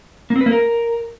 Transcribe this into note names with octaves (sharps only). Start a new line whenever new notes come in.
A#3
C4
B4
A#3
A#4